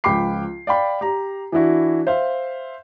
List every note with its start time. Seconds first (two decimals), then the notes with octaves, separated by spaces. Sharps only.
0.04 C#2 F3 G5 B5 D6 C7
0.67 D5 F5 G5 B5
1.01 G4 A#5
1.52 E3 D4 E4 F#4
2.07 C5 E5 F5